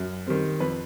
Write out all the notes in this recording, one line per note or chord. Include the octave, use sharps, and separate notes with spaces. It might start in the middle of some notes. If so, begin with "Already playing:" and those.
Already playing: F#2
D#3 G3 C4
F2 B4